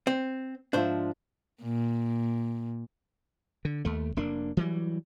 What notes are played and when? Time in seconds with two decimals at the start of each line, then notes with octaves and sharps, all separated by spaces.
0.07 C4
0.73 G#2 F3 D4 C5 E5
1.63 A#2
3.65 D3
3.85 D#2 A3
4.17 F1 A#3 D4
4.57 E3 F#3 G3